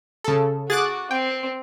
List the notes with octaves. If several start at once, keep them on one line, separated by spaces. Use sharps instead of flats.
C#3 A4
F#4 G#4 D6 F#6 A6
C4 G5